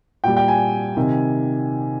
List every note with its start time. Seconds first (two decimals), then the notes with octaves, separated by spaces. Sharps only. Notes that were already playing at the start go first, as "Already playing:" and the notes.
0.24 A#2 G3 G5
0.37 G5
0.48 G#5
0.97 C3 D#3